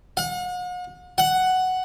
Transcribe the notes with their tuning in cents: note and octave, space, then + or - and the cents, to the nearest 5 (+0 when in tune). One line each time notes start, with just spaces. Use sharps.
F#5 -45
F#5 +5